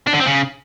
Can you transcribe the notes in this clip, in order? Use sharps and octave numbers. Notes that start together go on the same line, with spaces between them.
D4
D3
C4
C#3